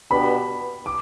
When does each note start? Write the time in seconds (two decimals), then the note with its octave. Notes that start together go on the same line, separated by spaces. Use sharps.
0.11 B2 B3 D4 G4 B4 B5
0.86 D6